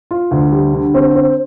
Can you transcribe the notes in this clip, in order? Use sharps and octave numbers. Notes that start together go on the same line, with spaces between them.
F4
D2
G3
D3
C4
C4